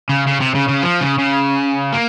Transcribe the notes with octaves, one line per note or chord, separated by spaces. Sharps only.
C#3
C#3
C3
C#3
C#3
F3
C#3
C#3
A#3